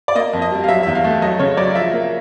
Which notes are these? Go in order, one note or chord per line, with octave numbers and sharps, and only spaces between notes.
D5
A#3 D#5
F2
D#5
G3
F5
F#3 E5
E2 E5
F5
A3
F#3 D#5
C#3 C#5
F#3 D5
F3 E5
A#3